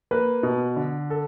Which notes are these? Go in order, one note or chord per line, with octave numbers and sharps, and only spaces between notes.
A#3 B4
B2
D3
A4